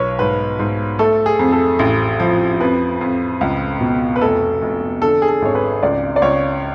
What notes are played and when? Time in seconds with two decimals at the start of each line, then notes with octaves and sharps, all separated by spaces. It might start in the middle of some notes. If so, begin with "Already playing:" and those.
Already playing: B1 B4 C#5
0.19 G#2 B4
0.59 G#2
0.99 A3 A4
1.26 G#4
1.39 F2
1.53 A4
1.79 A1
2.20 F3
2.60 F2 B4
3.01 F2
3.41 C#2
3.81 B2
4.16 B4
4.21 F1 A4
4.62 F1
5.01 D3 A4
5.22 G#4
5.29 A4
5.42 G#1 C#5
5.55 B4
5.83 C#2 D5
6.16 D5
6.22 C#2 C#5